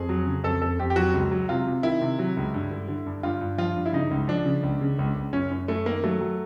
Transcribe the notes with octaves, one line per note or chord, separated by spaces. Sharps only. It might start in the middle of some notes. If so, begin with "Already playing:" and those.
Already playing: F2 G#4
F#3
C#3
F2 A4
F2 A4
F2 G4
G4
F#3 F#4
C#2
F#3
C3 F4
C3
D#3 E4
C3
F#3
C#2
G2
D3
D3
G2
G2 F4
G2
F3 F4
G2
E4
C#3 D#4
C#2
F3 D4
C#3
C#2
C#3
C#2
C#2
F#2 C#4
F#2
F#2 A3
D#3 A#3
F#3 A3
F#3